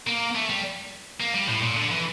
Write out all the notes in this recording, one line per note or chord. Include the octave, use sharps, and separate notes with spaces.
A#3
A3
G3
A#3
G3
A2
A#2
D3
E3